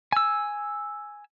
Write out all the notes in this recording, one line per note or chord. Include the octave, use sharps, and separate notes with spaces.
G#5 E6